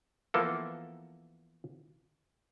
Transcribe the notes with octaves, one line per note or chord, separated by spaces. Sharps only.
E3 F3 A#3 B3 A4